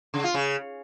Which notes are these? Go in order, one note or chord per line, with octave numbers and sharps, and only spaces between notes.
C#3
F4
C#3